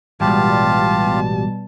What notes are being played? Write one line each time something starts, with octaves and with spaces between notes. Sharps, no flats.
A1 B2 G3 G#3 F4 G4 F5 A5